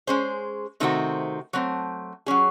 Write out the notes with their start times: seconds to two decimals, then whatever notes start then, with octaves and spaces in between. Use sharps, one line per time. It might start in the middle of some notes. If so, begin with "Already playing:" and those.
0.07 G#3 C#4 G#4 C5
0.80 C3 D#3 A3 C4 F#4
1.53 F#3 A3 C4
2.26 F#3 C#4 G#4